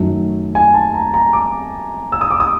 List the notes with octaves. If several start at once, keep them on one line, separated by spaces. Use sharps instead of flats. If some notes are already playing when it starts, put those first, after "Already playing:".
Already playing: F#2 D#3 F#3 A3
G#5
A5
A#5
A#5
D6
E6
D#6
D6
D#6